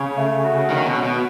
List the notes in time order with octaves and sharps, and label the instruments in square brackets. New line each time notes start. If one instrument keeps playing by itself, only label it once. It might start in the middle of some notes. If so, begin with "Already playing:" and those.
Already playing: [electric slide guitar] C#3 [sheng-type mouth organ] C#5
[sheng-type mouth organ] A3
F#4
[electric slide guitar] D#3 [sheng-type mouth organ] C#4
[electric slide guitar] B2
[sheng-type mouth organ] C#5
[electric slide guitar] B2